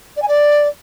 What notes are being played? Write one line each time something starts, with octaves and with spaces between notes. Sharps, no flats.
D5
G#5
D5